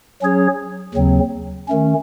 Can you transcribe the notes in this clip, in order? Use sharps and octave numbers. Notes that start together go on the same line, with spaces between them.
F#3 C#4 G#4 C#5
D#2 C#3 F#3 C4
D#3 A3 C#4